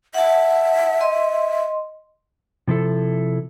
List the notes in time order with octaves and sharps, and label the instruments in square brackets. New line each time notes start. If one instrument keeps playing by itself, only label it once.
[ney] E5 [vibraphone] F#5 A5
[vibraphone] D#5 C6
[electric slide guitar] C3 F3 E4 A4